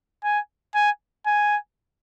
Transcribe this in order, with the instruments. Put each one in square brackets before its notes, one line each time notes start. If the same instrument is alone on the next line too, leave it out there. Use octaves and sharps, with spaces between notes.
[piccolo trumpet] G#5
G#5
G#5